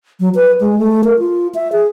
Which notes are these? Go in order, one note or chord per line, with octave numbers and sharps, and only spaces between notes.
F#3
B4
G#3
A3
A#4
F4
E5
G#4